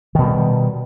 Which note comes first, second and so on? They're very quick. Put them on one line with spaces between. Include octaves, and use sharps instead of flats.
D#3 B2 G3